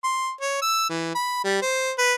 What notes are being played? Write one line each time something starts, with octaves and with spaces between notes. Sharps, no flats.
C6
C#5
E6
E3
B5
G3
C5
B4